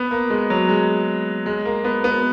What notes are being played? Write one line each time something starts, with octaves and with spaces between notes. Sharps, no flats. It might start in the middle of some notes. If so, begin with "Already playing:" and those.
Already playing: B3
A#3
G#3
F#3
G#3
G#3
A#3
B3
B3